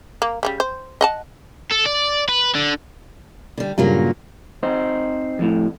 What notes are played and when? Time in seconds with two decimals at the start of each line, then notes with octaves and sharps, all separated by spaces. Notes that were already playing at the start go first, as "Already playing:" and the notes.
0.22 A#3
0.43 C#3 F3 G3
0.60 C5
1.01 D#5 F#5 A5
1.72 A4
1.86 D5
2.29 B4
2.55 D3
3.58 D3 G3
3.78 G2 A#2 C#3 F#3 G3 A#3
4.63 C4 D#4 C5
5.39 F2 A2